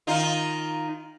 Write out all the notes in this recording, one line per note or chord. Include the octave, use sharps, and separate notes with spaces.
D#3 D#4 F4